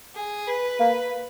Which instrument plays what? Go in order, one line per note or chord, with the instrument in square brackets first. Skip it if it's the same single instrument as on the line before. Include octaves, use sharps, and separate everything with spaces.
[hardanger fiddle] G#4
B4
[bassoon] A#3